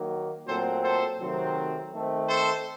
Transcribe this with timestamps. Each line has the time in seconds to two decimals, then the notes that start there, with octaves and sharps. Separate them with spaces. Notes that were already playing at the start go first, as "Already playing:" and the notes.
Already playing: D#3 F#3 A#3
0.47 A#2 F#3 A3 C4 A4 C5
0.83 A4 C5
1.19 C3 D#3 F#3 A3 C4
1.93 D#3 A3 C4
2.28 A4 C5